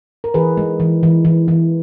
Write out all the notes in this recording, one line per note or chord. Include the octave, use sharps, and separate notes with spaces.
A#4
E3 G#4 B4
G#3
E3
E3
E3
E3